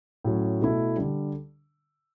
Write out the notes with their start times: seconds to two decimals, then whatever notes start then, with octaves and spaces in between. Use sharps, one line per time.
0.24 A2 F#3 C#4
0.60 B2 A3 E4
0.96 D3 G3 D4